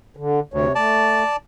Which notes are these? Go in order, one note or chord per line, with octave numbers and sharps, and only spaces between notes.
D3
D2 C3 C#5
A3 D5 A5